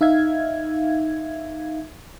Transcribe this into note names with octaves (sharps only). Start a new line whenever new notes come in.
D#4 E5 F5 G#6